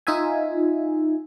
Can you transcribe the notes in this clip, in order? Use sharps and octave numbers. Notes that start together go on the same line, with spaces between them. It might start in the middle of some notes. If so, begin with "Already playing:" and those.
D#4 F4 E5 G#5